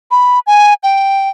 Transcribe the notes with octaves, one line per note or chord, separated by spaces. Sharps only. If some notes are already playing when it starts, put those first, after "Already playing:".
B5
G#5
G5